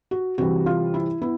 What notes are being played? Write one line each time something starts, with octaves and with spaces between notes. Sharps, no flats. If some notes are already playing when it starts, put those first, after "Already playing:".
F#4
C3 E3 G3 F#4
F4
E4
B3 E4